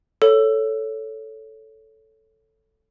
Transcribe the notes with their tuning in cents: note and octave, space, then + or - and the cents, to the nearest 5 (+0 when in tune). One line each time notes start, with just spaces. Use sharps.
A4 +0 C#5 +5